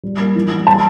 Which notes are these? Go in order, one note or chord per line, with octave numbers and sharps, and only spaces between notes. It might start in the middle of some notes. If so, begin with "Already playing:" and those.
G3
A#3
E3
G3
G3 A5